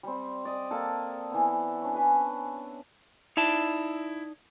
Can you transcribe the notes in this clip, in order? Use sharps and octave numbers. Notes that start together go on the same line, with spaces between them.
G3 C4
D5 D#5
A#3 A4 A5
E3 B3
C#4 D4
B4 E5 G#5
D#4 E4 D5 A5